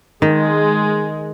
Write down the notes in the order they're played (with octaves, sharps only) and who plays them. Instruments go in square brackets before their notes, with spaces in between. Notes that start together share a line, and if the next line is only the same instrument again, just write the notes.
[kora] D#3 [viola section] G#3